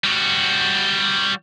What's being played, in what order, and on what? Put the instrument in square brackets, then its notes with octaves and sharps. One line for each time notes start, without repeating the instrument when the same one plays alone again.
[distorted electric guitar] G3 F#4